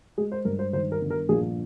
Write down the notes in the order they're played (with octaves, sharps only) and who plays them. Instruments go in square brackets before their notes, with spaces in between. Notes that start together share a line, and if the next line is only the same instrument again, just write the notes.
[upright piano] G#3 G#4
C5
G2 A#4
C5
D#3 C5
A#4
G1
A#4
A#1 G#4